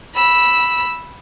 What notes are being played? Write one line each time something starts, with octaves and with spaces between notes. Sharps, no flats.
B5 E6